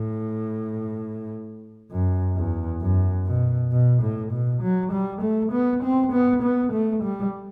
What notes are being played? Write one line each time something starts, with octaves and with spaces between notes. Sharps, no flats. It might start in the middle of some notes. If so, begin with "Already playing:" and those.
Already playing: A2
F#2
E2
F#2
B2
B2
A2
B2
F#3
G3
A3
B3
C4
B3
B3
A3
G3